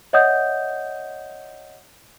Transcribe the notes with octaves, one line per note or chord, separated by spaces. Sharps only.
C#5 D#5 E5 F#5 D#6 G6